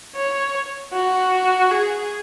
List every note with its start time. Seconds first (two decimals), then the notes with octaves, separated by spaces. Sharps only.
0.16 C#5
0.93 F#4
1.71 G#4